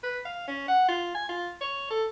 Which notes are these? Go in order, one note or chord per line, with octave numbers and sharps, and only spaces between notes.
B4
F5
C#4
F#5
F4
G#5
F4
C#5
A4